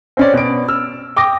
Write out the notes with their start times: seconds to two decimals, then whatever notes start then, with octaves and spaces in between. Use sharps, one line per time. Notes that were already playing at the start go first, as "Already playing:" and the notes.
0.17 C4 C#4 D5
0.33 B2 D7
0.68 E6 F6
1.16 G5 D6 D#6 A#6